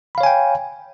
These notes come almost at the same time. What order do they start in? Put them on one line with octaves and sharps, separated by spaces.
B5 F5 C#5 G#5 G5